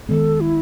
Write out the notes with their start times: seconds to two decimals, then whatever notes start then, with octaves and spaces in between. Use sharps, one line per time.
0.08 D#3 G#3 B3 A4
0.41 E4